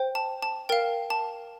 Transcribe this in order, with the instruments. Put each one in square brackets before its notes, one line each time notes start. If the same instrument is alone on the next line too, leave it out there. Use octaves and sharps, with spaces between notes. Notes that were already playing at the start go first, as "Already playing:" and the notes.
Already playing: [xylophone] C5 G5
A5
A5
A#4 F5 G5
A5